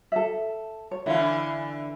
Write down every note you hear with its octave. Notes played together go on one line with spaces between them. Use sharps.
A4 E5
C#5
D3 E3 E4 F5